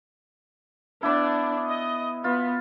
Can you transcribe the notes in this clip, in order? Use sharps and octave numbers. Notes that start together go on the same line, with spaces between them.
B3 D4 E4
D#5
B3 F4